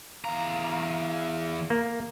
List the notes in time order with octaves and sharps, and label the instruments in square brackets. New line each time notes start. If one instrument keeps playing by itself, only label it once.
[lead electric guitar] E2 A#5 [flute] F5
[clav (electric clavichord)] A#3